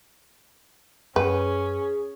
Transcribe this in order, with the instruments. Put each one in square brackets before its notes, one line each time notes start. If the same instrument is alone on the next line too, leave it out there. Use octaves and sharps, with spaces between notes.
[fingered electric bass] F#2 [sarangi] C#4 [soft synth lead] G#4 [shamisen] B4